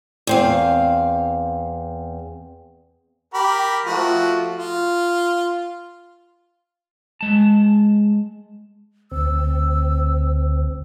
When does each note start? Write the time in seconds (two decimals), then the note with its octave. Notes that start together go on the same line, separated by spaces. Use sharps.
0.27 E2 C4 F5
3.34 G4 A#4 B5
3.86 F3 A3 F#4
4.56 F4
7.21 G#3 A5
9.11 D2 C4 E6